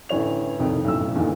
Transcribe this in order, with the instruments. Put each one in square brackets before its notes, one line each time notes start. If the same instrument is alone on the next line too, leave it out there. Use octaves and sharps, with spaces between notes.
[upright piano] A1 D3 E3 C#5 F7
C2 F2 C3 D#3
B1 F#2 A2 E6
E2 G2 A#2 D3 D#3